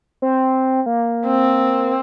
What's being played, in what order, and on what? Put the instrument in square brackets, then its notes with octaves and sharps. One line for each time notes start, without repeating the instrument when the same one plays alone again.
[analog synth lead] C4
A#3
[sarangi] C4